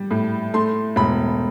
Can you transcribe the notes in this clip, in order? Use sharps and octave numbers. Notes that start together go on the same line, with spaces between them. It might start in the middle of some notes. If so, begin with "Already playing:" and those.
Already playing: G3
A2
A3 C6
E1 B5